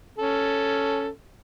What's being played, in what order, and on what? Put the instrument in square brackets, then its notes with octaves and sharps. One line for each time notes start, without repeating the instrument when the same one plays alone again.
[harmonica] C#4 A4